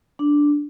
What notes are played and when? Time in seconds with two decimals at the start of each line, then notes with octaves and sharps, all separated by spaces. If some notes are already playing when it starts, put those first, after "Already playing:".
0.19 D4